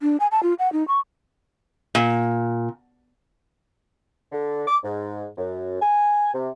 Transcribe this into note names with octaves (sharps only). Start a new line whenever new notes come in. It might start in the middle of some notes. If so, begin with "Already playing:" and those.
D4
G#5
A5
F4
F#5
D#4
C#6
A#2
D3
D6
G#2
F#2
G#5
C3